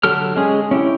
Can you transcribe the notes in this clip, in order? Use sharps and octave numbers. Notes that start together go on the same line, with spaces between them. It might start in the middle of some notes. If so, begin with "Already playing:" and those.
D3 F#3 G4 A4 F6
G#3 C#4 G#4
C#4 E4 G4